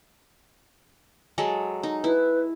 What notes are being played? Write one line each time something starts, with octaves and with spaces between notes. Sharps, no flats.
F#3 G#3 A4
D#4
E4 B4